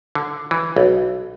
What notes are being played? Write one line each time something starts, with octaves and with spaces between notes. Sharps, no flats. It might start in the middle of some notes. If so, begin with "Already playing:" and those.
D3
E3
B1